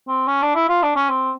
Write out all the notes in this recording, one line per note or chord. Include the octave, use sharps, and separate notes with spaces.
C4
C#4
D4
E4
F4
D4
C#4
C4